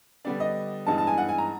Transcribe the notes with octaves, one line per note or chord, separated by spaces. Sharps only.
D3 G3 B3 D4 D5
D#5
G2 E3 G#3 B3 D#4 A5
A5
G#5
F#5
G#5
A#5